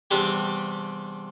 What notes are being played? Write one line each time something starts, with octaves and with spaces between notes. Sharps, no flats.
E2 C3 G3 D4 G4